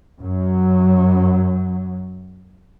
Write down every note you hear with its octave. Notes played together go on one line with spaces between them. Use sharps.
F#2 F#3